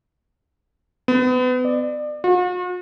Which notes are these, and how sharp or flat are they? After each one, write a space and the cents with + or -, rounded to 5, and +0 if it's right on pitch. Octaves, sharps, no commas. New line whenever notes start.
B3 +35
D5 +30
F#4 -45